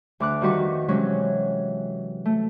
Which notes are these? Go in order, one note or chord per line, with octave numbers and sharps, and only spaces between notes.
D2 D6 F#6
F2 D#3 G3 F#4 B4 C#6
C3 E3 F#3 G#3 C#4
A3